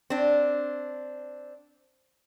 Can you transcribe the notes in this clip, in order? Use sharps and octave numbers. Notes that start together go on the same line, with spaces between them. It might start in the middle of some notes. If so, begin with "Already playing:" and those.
C4 D4